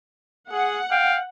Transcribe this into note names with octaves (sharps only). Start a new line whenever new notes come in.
G#4 F#5
F5 G5